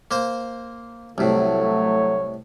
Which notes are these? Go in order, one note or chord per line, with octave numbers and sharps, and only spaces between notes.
A#3 C5
C2 A2 F#3 A3 C#5